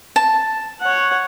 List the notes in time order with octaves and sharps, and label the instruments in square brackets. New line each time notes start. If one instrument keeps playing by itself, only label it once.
[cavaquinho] A5
[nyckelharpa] C#5 F#5